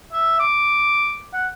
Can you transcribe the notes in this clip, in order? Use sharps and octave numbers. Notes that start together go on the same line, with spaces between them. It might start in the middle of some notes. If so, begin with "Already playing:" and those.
E5
D6
F#5